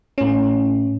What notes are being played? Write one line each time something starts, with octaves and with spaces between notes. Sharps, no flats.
A2 C#4